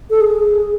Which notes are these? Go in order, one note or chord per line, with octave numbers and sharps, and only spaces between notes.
A4
G#4